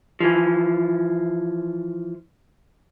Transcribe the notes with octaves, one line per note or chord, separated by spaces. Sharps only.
E3 F3